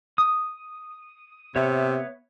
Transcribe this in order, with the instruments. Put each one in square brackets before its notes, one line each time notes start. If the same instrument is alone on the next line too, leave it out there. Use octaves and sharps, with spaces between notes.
[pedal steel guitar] D#6
[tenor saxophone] C3 [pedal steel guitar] B3 C#5 E5